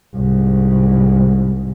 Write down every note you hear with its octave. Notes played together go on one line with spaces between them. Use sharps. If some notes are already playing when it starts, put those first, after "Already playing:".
C2 G#2